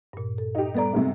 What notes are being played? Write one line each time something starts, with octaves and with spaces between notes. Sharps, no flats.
G2 A#2
A4
D#4 G4
G3 B3 A4 D5 A#5
B1 G#2 C3